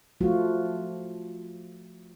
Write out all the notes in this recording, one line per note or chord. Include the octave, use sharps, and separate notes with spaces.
F3 A3 F4 F#4